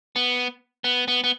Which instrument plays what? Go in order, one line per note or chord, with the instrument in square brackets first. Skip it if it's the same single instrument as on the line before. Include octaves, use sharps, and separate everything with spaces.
[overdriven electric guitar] B3
B3
B3
B3